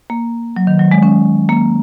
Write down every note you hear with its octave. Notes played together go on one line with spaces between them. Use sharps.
A#3
F#3
D#3
F#3
G#3
C#4
A#3